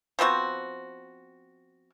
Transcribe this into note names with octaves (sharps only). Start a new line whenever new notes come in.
F3 B3 C4 F#4